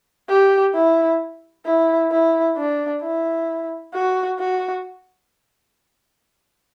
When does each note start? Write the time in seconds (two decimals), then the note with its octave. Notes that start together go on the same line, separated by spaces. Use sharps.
0.29 G4
0.74 E4
1.66 E4
2.11 E4
2.57 D4
3.02 E4
3.94 F#4
4.40 F#4